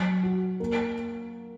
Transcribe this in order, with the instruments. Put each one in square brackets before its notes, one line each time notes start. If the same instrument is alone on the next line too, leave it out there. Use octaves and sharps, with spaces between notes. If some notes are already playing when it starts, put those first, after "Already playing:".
Already playing: [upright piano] F#3
F#4
A#3